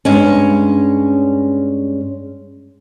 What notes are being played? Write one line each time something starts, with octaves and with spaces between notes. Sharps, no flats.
G2 G#3 C#4